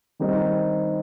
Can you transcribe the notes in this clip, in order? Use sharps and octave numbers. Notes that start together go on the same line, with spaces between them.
D#3 G3 C4 D#4